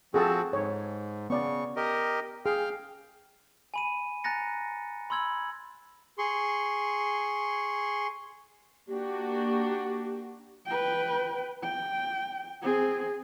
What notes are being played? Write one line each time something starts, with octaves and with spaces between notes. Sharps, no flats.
F3 C4 F#4 G#4 A4 A5
G#2 C#5
C#3 B3 D5 C#6
G4 A#4 D#5
G#4 F5 G5 F6
G#5 B5 D#7
G#5 A#5 F#6 A6 A#6 C#7
B5 C6 E6 G#6 F#7
G#4 C6 C#6
A#3 D4 F#4 G4
B4 G5
G5
C4 G#4